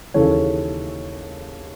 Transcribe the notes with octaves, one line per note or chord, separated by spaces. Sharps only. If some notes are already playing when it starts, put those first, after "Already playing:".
D#2 C#3 E3 A4 C#5